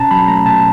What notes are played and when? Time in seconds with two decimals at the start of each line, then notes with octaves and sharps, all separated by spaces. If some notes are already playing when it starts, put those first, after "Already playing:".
Already playing: B2 C#4 A5 A#5
0.11 F#3 B5
0.28 A3 A#5
0.46 B2 A5